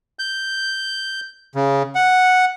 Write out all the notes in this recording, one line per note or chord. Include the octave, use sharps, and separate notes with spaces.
G6
C#3
F#5